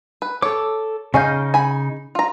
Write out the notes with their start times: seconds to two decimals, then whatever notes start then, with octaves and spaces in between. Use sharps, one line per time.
0.22 B4
0.42 A4 C#5 D6
1.14 C#3 C#4 D#4 D#5 F5 G6
1.54 G#5 B5
2.15 F4 A#5